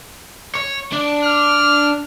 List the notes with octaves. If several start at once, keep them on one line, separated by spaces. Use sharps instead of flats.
C#5
D4
F6